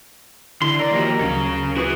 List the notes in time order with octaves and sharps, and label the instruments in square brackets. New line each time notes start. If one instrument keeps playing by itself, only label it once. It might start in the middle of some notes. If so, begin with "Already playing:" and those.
[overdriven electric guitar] D3 [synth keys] E4 [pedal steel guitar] C6
[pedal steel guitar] A#4 [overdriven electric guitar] D5
[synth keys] D#3 F3 F#4 [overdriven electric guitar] A#3 G4
[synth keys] D2 C#3 F#3 [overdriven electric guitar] C#4 F5
[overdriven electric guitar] E4 B4 [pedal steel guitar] F#4 G#4